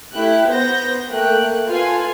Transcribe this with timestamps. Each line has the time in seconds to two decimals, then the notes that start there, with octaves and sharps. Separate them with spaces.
0.13 A3 E4 G4 F#6
0.48 B3 B4 C5 G6 A#6
1.12 A3 A#3 G5 F#6
1.68 F4 A4 B4 G#5 C7